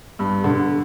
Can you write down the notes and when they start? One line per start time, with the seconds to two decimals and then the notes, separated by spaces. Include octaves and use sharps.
0.19 G2
0.44 D3